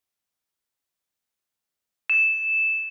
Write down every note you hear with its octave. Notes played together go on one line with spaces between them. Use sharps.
E7